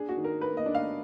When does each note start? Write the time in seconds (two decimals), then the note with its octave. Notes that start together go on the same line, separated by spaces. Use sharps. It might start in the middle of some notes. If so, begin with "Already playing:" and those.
Already playing: D4 G#4
0.09 F#4
0.17 D#3
0.24 A#4
0.41 A#3 B4
0.57 D#5
0.66 D4
0.75 F5